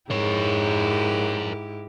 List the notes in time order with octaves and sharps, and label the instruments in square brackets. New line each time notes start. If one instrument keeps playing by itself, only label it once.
[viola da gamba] G#2 E4 G4 [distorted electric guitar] A#4 C#5